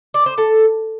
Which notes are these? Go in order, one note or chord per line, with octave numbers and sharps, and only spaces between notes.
D5
C5
A4